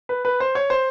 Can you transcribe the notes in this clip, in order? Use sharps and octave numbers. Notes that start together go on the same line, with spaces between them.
B4
B4
C5
C#5
C5